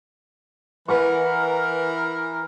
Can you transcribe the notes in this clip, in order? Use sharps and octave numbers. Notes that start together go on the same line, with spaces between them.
E3 A#4 B4 F#5 C#6